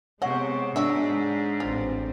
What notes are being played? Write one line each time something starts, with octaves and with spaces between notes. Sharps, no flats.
C3 G#3 B3 C#5 D#5 F#5
G#2 D4 F#4 E5
A1 C4 F4